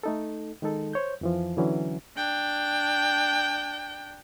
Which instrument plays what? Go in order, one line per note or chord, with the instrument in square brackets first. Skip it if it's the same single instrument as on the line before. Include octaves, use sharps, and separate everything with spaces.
[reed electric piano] A3 D#4 A4
D#3 G#3 D#4 A4
C5 C#5 G6
F2 E3 F3
D3 E3 F#3 C#4
[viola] D4 G5